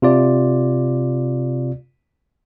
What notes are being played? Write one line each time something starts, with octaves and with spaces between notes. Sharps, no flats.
C3 F4 D5